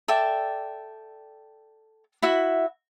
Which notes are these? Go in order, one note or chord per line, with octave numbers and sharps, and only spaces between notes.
A4 D5 E5 G5
E4 F#4 E5